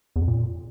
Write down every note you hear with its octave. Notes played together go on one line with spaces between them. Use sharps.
E2
F2
A#2